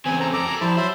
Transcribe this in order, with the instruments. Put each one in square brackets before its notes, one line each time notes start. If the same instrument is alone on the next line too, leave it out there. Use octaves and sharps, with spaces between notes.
[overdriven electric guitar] E2 C#3 [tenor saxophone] C4 [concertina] G#5
[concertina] A4 A#5
[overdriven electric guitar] F2 [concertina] A4 A#5 D6
[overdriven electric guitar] A#4 G#5
[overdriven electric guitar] F3 [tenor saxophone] G3 [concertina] E4 C5 A5
[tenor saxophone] F#3 [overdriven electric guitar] C5 [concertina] E5 B5 C6